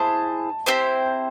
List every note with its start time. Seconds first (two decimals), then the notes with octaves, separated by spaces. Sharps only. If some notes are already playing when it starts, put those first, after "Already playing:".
Already playing: E4 G#4 C5 A5
0.66 C4 E4 G4 C5